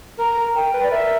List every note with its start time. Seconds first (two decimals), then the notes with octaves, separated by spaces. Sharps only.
0.19 A#4 A#5
0.37 A#4
0.55 A#4 G5
0.74 B4
0.83 D5
0.91 A#4 E5